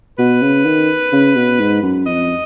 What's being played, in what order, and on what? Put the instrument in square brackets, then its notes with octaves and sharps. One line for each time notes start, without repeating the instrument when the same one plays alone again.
[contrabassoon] B2 [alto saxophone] B4
[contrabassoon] C#3
D#3
C#3
B2
G#2
F#2
[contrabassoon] F2 [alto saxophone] D#5